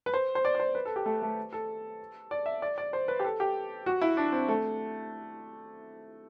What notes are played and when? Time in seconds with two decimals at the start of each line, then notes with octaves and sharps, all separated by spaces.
0.06 B4
0.14 C5
0.35 C5
0.45 D5
0.55 D5
0.60 C5
0.75 B4
0.85 A4
0.96 G4
1.06 A3
1.22 A3
1.53 A4
2.31 D5
2.46 E5
2.62 D5
2.78 D5
2.93 C5
3.08 B4
3.20 G4
3.24 A4
3.40 G4
3.86 F#4
4.01 E4
4.17 D4
4.32 C4
4.48 A3